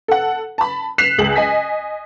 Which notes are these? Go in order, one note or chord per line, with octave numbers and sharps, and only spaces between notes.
A4 F#5
A5 B5
F#6 B6 C7 E7 F7
C#2 G#4 F#7
D#5 G#5 B6